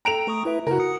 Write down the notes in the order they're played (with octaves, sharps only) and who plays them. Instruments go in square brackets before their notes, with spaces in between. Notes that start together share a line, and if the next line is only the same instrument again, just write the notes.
[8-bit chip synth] A4 G5 [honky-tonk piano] A#5 D7 F7
[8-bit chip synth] A3 C#6 D#6
E4 B4 E5
[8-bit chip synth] C#3 E4 [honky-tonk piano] F#4 A#4
[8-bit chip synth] D#6 C#7